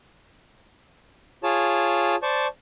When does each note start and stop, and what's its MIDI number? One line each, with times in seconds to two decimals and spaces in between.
1.43 2.16 65
1.43 2.16 68
1.43 2.16 73
1.43 2.16 81
2.23 2.47 72
2.23 2.47 74
2.23 2.47 81
2.23 2.47 85